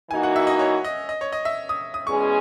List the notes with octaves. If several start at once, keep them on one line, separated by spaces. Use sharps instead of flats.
E3 A#3 D#4 F#4 G#5
F#5
E5
D#5
C#5
D#5
D#5
C#5
D#5
E5
D#6
D#6
E2 B2 G#3 C#4 G#4 C#6